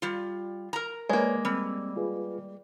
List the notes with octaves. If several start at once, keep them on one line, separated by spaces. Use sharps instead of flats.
G3 F4
A#4 A#5
G#3 A#3 B4 C#5 D5
G3 C4 E6
F4 G#4 B4